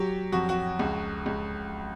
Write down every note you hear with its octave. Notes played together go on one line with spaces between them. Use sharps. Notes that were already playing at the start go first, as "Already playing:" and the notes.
Already playing: F#3 G4
F2 F#4
F#4
C#2
C#2